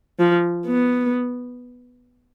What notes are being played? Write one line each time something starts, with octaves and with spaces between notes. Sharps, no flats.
F3
B3